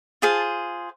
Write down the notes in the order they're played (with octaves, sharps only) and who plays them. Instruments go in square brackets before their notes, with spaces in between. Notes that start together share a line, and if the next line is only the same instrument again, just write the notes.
[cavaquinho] F4 G#4 C5 A5